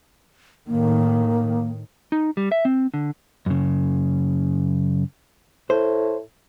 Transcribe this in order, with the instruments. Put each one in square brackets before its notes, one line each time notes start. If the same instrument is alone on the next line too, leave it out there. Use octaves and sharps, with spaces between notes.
[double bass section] A2 D#3 [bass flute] A#3
[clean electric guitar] D#4
G3
E5
C4
D3
[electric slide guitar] F#2 C#3
[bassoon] A2 [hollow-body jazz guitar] C5